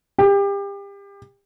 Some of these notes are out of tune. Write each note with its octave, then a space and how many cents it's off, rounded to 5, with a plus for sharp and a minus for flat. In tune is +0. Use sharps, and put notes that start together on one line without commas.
G4 +30